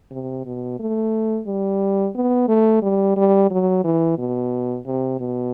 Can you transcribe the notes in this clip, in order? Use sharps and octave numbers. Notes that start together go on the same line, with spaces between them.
C3
B2
A3
G3
B3
A3
G3
G3
F#3
E3
B2
C3
B2